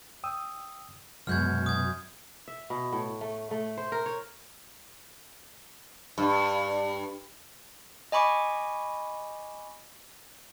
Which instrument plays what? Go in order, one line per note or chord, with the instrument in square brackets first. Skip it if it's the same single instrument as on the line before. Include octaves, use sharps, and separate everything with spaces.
[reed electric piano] G5 D#6 E6
[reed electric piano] C2 G#3 [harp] F#2 F#4 [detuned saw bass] B2 [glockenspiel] F6 G6 G#6
[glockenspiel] D#6 G#6
[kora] E5
B2
A2
A3
A3
C5
A#4
C#5
[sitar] G2
[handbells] D#5 G#5 B5 C#6 D6